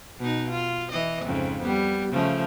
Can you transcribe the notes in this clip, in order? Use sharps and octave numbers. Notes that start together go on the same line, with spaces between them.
B2 D#4
F4
E3 D#5
F2 G#2 C#3
G3 B3
C#3 F3 A3